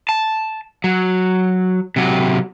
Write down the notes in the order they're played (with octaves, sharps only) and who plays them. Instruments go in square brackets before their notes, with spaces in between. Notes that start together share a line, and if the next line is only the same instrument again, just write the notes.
[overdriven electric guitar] A5
F#3
C3 F#3